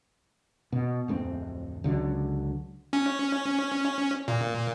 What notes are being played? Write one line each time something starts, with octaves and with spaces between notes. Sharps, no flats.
B2
D1 F2 G#3 C4
C#2 D3 D#3 F#3
C#4
A#2